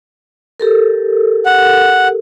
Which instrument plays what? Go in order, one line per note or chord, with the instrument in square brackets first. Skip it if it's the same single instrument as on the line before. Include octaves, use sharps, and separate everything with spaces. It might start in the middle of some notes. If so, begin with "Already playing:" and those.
[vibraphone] G4 A4 A#4
[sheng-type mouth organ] F#5